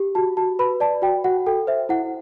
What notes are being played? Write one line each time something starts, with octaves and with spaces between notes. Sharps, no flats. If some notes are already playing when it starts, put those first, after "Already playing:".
Already playing: G4
F#4 A5
F#4 A5
B4 B5
D5 A5
F#4 G5
F#4 F#5
A4 G5
C5 E5
E4 F#5